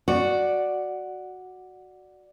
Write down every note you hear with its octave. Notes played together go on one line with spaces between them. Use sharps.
F#4 D5